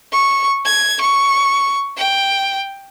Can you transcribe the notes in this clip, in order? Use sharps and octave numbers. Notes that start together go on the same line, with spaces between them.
C#6
G#6
C#6
G5